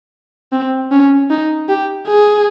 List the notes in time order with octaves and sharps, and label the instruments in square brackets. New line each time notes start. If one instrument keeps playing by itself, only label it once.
[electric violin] C4
C#4
D#4
G4
G#4